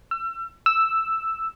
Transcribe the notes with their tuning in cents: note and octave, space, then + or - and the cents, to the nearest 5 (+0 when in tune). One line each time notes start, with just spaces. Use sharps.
E6 +35
E6 +0